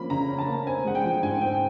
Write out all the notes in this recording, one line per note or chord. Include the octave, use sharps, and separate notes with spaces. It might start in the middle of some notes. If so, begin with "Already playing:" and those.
Already playing: F3 A#3 C#4 B5
C#3 A#5
C#4
A5
A#3
C4 G#5
G#3 F#5
G5
F3
G#2 G#5
C4 G5